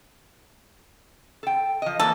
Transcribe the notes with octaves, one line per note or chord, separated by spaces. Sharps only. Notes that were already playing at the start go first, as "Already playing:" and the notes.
A4 G5
F3 D#5
E3 F3 A#3 A4